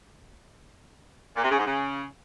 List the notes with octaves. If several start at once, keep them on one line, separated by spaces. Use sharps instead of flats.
A#2
C3
C#3
G#2
C#3